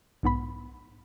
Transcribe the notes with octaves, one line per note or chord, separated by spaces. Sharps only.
B1 G#2 B3 B5